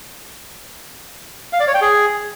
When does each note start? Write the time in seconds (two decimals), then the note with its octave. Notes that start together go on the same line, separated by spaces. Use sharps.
1.53 F5
1.60 D5
1.67 C#5
1.74 G5
1.82 G#4